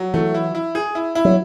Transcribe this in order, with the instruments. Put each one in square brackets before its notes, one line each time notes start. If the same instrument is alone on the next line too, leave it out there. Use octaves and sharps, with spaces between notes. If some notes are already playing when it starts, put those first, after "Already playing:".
Already playing: [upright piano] F#3
[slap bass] E3 [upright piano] A3
[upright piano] E4
E4
G#4
E4
E4
[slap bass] F#3